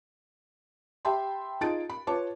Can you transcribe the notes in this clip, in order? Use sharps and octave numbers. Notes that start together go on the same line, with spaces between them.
G4 E5 G5 A5 B5 C6
D#4 F4 G#4 A5 A6 D7
B5
F4 B4 C#5 A5 D6